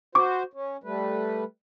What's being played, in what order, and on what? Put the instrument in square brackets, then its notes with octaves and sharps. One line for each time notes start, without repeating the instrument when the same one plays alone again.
[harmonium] F#4 C5 [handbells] C#6 D6
[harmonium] C#4
G3 A3 B4